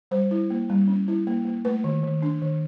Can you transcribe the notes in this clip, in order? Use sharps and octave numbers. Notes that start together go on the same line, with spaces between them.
G3 C5
E4
A#3
G3
C#4
E4
A#3
A#3
A3 B4
D#3
D#3
D4
D#3